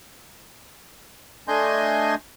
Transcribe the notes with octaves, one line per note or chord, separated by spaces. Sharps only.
A3 D4 D#5 G#5 C6 G6